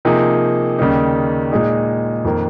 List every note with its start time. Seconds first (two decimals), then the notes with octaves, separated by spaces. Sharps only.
0.05 C3 F3 A#3 D#4 G#4
0.79 D#2 C#3 G3 A#3 D#4
1.52 A#2 G#3 D#4 G#4
2.25 F2 D#3 A#3